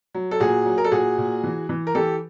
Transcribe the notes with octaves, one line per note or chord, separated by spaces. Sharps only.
F#3
A4
A#2 F#4 G#4
F#3
A#4
A4
A#2 F#4 G#4
A#2
E3
E3
A#4
E3 G4 A4